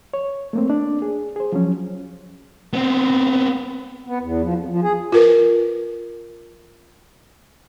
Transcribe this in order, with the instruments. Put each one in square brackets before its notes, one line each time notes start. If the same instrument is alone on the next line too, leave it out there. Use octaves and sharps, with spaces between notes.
[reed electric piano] C#5
A3 A#3 C4
D4 D5
G#4
G#4 C5
F3 F#3 C#4
[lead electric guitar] B3 C4
[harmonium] B3
E2
F3
F2
F3
G#4
[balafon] F4 A#4 B4